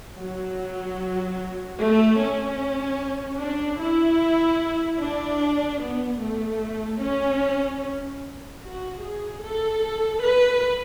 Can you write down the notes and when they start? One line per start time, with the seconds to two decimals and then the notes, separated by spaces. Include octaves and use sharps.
0.19 F#3
1.80 A3
2.20 C#4
3.40 D4
3.81 E4
5.00 D4
5.81 B3
6.21 A3
7.01 C#4
8.63 F#4
9.03 G#4
9.43 A4
10.23 B4